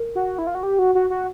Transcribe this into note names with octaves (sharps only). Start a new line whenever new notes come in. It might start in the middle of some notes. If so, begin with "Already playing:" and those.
Already playing: A#4
F#4
E4
F4
F#4
G4
F#4
F#4
F#4